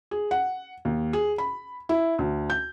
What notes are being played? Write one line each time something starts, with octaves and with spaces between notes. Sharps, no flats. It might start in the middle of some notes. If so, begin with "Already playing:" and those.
G#4
F#5
D#2
G#4
B5
E4
D2
G6